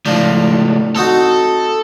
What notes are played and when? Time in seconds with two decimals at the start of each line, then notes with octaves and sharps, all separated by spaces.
0.06 C#2 A2 F3 D4
0.96 C4 D#4 F#4 A4